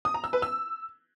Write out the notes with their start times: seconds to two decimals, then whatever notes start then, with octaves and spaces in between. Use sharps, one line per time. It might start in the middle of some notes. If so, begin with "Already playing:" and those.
0.05 D#6
0.14 A#5
0.24 E6
0.33 B4
0.42 E6